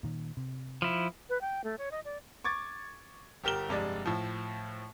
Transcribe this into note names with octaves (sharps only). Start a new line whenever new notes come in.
A#2 D#3
C3
F3 E4
B4
G5
A3
C#5
D#5
D5
C#6 D6 G#6 A6
G1 G4 A#4 E7 G7
F1 G2 G#3 D5
A2 F3